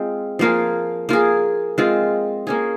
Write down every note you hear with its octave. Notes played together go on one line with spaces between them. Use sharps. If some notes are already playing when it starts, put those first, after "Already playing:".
Already playing: G#3 C4 F4
F3 A#3 F4 G#4
A#3 F4 G#4
G#3 C4 F4
A#3 C#4 G#4